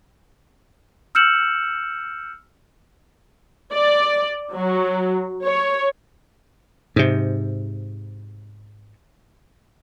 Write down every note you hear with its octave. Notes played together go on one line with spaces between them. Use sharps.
E6 F6 G6 C#7 E7 F#7
D5
F#3
C#5
G#2 C3